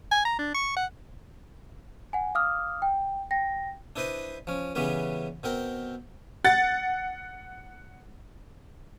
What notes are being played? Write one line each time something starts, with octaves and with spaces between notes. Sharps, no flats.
G#5
A#5
D4
C#6
F#5
F#5 G#5
F5 D6 D#6 F6
G5
G5 A#6
D4 E4 B4 C5 D#5
F3 C#4
C#3 E3 G3 B3 C#4 B4
B2 C4 A#4 G5
F#5 A6